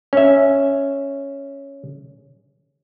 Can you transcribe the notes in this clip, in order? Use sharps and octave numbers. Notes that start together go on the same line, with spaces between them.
C#4 E5